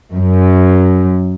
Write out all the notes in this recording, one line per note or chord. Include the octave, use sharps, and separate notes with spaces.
F#2